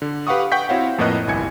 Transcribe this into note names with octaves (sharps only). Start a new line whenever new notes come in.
D3
G4 B4 F5 F#5 C#6 D#6
F#5 G5 C#6 G6 B6
C4 E4 F#4 C#5 F5 F#5
F2 A2 A#3 B4 D#5 F#6
G1 C2 E4 G#5 G#6 C#7